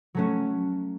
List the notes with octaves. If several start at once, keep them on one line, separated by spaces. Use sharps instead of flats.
F#3 A3 C#4 F#4